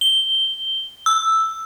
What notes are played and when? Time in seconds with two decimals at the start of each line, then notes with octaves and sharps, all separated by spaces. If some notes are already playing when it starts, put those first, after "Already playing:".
0.01 G7
1.06 E6